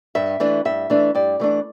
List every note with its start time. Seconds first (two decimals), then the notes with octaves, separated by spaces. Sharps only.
0.15 G2 E5
0.40 E3 A3 D4
0.65 G2 E5
0.90 E3 A3 D4
1.15 G2 D5
1.40 E3 A3 D4